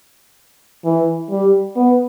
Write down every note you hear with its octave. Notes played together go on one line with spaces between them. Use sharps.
E3
G3
B3